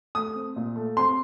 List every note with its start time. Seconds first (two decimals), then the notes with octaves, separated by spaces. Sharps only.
0.15 A3 D#6
0.35 C4
0.56 A#2
0.76 A3
0.97 C4 C6